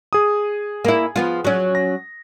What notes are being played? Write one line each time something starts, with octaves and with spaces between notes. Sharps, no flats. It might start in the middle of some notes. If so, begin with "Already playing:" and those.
G#4 D#6
A#3 E4
F3 B3 F4
F#3 C#4
A#6